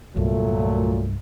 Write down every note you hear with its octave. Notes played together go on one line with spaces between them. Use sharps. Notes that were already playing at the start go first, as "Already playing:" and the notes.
C2 G2 A#2 F#3 A3